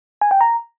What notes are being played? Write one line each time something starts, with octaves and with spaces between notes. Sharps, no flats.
G#5
G5
A#5